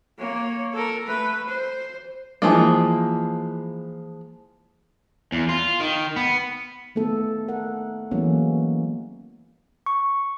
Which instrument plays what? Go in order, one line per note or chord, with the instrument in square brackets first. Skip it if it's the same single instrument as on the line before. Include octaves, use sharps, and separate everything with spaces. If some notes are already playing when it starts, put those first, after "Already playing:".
[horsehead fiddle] A#3 C#5
A4 A#4
A3 B4
C5
[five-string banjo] E3 F3 G#3 A#3
[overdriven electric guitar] E2
F4
D#3
B3
[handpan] D#3 A3 B3 A4
A#4 F#5
E3 F#3 G#3 A#3 B3 C#4
[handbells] C#6